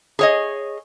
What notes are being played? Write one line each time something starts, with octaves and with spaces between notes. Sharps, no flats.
G#4 C#5 D#5